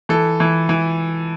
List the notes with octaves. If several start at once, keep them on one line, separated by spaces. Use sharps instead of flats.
E3 A4
E3
E3